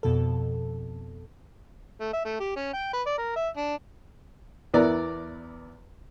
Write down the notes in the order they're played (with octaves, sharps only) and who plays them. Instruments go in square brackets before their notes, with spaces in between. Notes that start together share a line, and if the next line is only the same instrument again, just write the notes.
[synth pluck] F2 B2 A4
[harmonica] A3
E5
A3
G4
C#4
G5
B4
D5
A#4
E5
D4
[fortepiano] E2 B3 E4 A#4 B4 D5